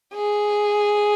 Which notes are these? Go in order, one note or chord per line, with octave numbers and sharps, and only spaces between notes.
G#4